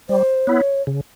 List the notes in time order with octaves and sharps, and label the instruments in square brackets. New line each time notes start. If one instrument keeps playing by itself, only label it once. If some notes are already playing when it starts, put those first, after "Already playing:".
[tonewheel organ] G3 [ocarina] C5
[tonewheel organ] B3 E4 [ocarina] C#5
[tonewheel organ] C#3